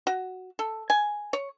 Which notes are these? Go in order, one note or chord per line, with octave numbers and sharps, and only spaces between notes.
F#4
A4
G#5
C#5